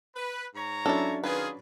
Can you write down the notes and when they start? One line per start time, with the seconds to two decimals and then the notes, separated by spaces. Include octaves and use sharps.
0.16 B4
0.55 G#2 C#5 A#5
0.86 F#3 C#4 D4 E4 A4
1.24 D#3 F4 G#4 B4